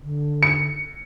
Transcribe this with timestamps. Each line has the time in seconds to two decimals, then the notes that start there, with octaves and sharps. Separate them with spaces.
0.03 D3
0.43 C#7